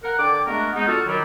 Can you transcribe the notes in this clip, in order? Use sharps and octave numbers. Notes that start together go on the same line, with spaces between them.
A#4 F#5
D3 D5 G5 D6
G#3 A3 B3 D4 F#4 A#4
G#3 B3 D#4
D3 F4 F#4 A4 A5 F6
D#3 F#3 G3